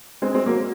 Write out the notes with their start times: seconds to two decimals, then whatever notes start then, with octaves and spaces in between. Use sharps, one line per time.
0.22 G#3 C4
0.34 G#3 C4
0.46 F#3 A#3